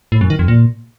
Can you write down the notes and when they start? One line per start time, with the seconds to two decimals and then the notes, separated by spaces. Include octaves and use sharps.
0.12 A2
0.21 F#2
0.30 D#3
0.39 F2
0.48 A#2